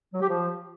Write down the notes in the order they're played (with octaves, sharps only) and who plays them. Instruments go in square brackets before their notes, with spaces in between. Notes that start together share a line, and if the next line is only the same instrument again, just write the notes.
[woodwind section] F#3
G4
F3